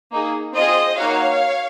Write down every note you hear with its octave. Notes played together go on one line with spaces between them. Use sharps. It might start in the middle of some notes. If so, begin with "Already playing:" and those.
A#3 D#4 G#4
C4 F4 G#4 C5 D#5
A#3 D#4 F#4 C#5 F5